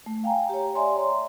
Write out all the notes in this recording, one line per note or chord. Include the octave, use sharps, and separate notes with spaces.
A3
F5 G5 G#5 A#5
G4 C#5
C#5 D5 E5 G#5 A#5 C6
C6